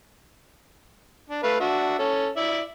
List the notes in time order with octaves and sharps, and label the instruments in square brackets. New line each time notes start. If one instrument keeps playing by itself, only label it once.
[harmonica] D4
A3 B4 F5
D4 F#4 E5
C#4 A4
E4 D5 E5